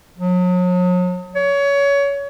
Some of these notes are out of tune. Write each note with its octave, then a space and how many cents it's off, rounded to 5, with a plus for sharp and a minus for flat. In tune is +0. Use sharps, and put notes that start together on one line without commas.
F#3 -40
C#5 +25